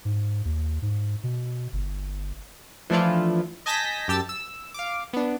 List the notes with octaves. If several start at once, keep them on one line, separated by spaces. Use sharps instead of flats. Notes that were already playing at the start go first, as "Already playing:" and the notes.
G#2
D#2
G#2
B2
G1
E3 F3 A3 D4 E4 F4
D#5 G#5 A5 G6 A#6 B6
F#2 G4 A5 E6
E6
F5 D6
B3 D4